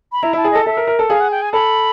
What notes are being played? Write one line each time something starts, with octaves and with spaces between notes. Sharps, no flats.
B5
E4 A#5
E4 A5
G#4
A4 D#5
A4 E5
A#4
A#4
A4
G#4 F5
F#5
G5
G#5
A4 B5